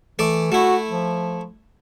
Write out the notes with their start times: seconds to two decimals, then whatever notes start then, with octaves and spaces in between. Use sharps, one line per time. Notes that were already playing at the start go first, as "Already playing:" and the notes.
0.19 E3 A3 D5
0.52 A3 E4 F#4
0.90 F3